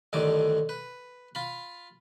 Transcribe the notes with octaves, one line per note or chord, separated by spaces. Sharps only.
A1 G2 D3 D#3 D6
B4
F4 B5